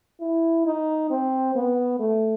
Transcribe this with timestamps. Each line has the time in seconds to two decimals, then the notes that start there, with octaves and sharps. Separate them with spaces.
0.21 E4
0.66 D#4
1.10 C4
1.55 B3
1.99 A3